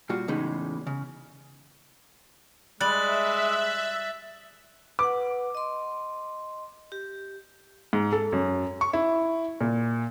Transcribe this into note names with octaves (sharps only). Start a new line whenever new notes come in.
A#2 G3 F4 F#4
E2 A2 C#3 G#3 D#4 B5
C#3
G3 G#3 E5 F#6 A6 F#7
B4 F#5 D6
D#5 C6
G4
G#2
A4
F#2
C#6
E4
A#2